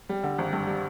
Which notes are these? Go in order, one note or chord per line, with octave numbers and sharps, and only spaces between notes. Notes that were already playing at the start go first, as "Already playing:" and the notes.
G3
D3
G#1
G2
G3